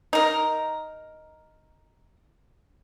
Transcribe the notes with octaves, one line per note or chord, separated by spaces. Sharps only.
D#4 A#4